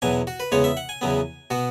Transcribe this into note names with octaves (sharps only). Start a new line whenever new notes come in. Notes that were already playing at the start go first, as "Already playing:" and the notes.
E2 B2 F#3 G#5
F#4
B4
E2 C#3 G#3 B3 C#5
E5
F#5
G#5
E2 C#3 F#3 B3
B2 B3 F#4